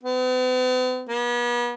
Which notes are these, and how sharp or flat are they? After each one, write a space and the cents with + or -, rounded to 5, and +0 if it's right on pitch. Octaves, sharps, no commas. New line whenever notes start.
B3 +45
B3 -40